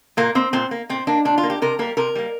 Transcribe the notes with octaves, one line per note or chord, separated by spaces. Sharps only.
A#2 A#3
A#3 C4
A#2 C4
A#3
A#2 C4
A#3 D4
A#2 D4
F4
A#3
G4
C3 A#4
G3 A#3 A#4
C3 A#4
G3 A#3